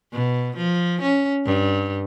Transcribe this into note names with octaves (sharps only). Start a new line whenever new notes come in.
B2
F3
C#4
G2